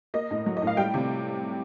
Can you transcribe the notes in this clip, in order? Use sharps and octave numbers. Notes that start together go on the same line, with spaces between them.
A#3 D#5
A2
F#3
D#5
A2
F5
G3 G5
C3